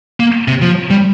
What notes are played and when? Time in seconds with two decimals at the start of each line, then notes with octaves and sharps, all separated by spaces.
0.20 A#3
0.48 C3
0.62 F3
0.91 G3